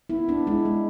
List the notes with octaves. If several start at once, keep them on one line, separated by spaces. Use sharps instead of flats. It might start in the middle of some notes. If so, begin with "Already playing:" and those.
B3 E4
B3 D4
G#3 E4
G#3